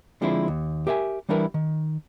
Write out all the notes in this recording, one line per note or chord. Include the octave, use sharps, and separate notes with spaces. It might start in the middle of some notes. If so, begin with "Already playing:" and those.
D3 F3 G#3 C4 D4 E4
D#2
G4 A#4 E5 F#5 G#5
E3 G3 D4 E4 A#4 B4
D#3